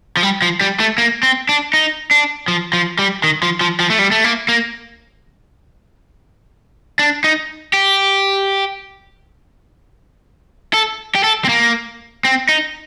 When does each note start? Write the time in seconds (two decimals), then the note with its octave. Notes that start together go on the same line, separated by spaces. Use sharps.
0.17 F3
0.23 G3
0.42 F3
0.61 G3
0.80 A3
0.98 A#3
1.23 C4
1.49 D4
1.73 D#4
2.11 D4
2.48 F3
2.73 F3
2.99 G3
3.24 D#3
3.43 F3
3.61 F3
3.80 F3
3.90 A3
3.99 G3
4.11 A3
4.24 A#3
4.49 A#3
6.99 D4
7.24 D#4
7.74 G4
10.74 A4
11.15 G4
11.24 A4
11.45 C4
11.49 A#3
12.25 C4
12.49 D#4